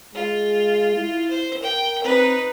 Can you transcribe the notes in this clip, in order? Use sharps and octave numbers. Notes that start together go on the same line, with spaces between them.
G#3 F4
E4
C5
A#4 G5
C4 D#4 B4